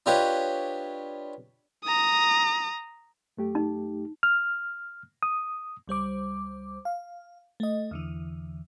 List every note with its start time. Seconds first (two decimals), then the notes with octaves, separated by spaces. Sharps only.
0.06 D4 F4 G4 B4 C#5 D#5
1.84 A#5 D#6
3.37 F#2 A3 G4
3.55 D#4
4.23 F6
5.23 D#6
5.88 C#2 G3 C5 D6
6.85 F5
7.60 A3 D#5
7.91 E2 D3 E3